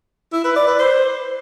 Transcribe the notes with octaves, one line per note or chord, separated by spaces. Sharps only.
E4
B4
D5
B4
C5